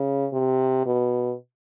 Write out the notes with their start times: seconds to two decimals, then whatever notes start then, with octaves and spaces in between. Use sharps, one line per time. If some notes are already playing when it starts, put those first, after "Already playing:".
Already playing: C#3
0.33 C3
0.86 B2